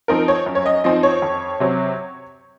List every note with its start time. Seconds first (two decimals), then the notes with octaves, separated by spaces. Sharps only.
0.08 F3 C4 D#4 A#4
0.28 C#5
0.46 F#2
0.55 C#5
0.66 D#5
0.84 F3 C4 D#4 D#5
1.03 C#5
1.22 F2
1.60 C3 F#3 C4